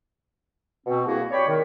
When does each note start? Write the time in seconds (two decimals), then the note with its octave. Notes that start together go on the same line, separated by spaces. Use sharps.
0.87 B2 C4
1.05 C2 A#3 E4 F#4 G#4
1.32 C#5 D5 G5 B5 C#6
1.48 D#3